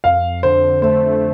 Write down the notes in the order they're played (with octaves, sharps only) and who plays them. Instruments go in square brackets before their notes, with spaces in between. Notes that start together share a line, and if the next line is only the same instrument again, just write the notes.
[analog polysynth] F2 [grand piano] F5
[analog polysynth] D3 [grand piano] C5
[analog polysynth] A3 [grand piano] C5